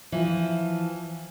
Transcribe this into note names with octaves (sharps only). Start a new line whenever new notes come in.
E3 F3